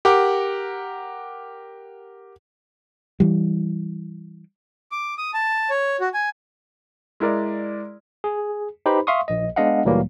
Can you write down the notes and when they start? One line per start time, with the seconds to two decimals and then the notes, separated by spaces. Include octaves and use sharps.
0.05 G4 A#4 F#5 A#5 D6
3.20 E3 G3
4.92 D6
5.18 D#6
5.34 A5
5.70 C#5
6.00 F#4
6.14 G#5
7.20 G#3 E4 A#4 D5
8.24 G#4
8.86 D#4 G4 B4 C5 B5
9.07 E5 F5 C6 C#6 D#6
9.28 A#1 D#5
9.56 G#3 B3 D4 D#5 F5 F#5
9.85 D2 A#2 E3 F#3 G3 A#3